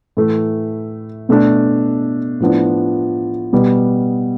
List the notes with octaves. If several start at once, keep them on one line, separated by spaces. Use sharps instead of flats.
A2 E3 A3
B2 A3 D4
A2 F3 B3 D4
B2 G3 B3